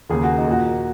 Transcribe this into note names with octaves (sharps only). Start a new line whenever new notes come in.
D#2 C#3 A#3 G#4
F#4
D#4
A#2 A#3 F#4